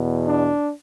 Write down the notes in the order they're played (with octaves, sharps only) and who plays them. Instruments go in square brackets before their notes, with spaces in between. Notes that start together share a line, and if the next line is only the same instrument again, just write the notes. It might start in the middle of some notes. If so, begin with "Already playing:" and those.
Already playing: [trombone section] E2 B2
D4